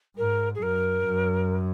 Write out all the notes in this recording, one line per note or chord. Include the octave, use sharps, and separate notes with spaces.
G#2 A#4
G#4
F#2 A#4
F#2